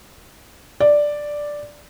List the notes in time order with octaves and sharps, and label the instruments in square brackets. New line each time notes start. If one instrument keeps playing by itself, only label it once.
[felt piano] D5